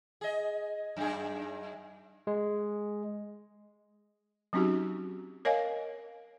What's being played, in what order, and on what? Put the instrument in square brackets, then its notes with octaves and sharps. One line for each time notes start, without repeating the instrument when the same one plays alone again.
[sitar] G#4 D#5
F#2 G#4
[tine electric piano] G#3
[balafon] F#3 C4 C#4 D#4 F#4 G4
A#4 C#5 D#5 F5 G#5